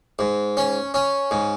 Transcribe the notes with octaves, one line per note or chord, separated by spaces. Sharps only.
G#2
C#4
C#4
G#2